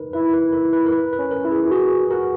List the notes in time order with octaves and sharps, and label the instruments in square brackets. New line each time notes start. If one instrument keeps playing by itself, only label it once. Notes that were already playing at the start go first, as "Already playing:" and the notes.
Already playing: [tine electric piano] D#4 A#4 B4
[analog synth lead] E4 [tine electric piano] B4
[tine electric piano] B4
A#4
B4
A#4
B4
B4
[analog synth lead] C#4
[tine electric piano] A#4
[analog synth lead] E4
[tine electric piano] G#4
[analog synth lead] E4
[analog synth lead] F#4 [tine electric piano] G#4
[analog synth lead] F#4 [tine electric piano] A#4